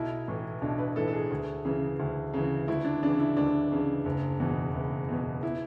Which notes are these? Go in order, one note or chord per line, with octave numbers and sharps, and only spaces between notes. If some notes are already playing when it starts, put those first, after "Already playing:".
Already playing: B1 E4
A2 E3
B1 D4
B4
A2 E3 A4
A4
G#4
D2
C#3 E3
D2
C#3 E3
D2 E4
D4
C#3 E3 D4
E4
D2 D4
C#3 E3
F#1
E2 B2
F#1
E2 B2
E4